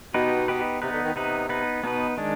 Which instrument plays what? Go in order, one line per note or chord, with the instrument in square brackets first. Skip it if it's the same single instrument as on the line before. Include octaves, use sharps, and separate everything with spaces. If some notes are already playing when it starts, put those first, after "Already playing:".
[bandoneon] B2 [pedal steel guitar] B3 D#4 G4 B4
[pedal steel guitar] B3 D#4 G4 B4
[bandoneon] C3 [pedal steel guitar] B3 D#4 B4
[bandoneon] D3
D#3
[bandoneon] C3 [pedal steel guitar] B3 D#4 B4
[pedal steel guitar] B3 D#4 B4
[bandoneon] B2 [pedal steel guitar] B3 D#4 B4
[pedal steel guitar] D#3 G#3 D4